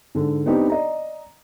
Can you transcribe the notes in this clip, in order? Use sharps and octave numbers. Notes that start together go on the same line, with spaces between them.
G#2 D3
B3 C4 D4 D#4 G4
D5 D#5 A#5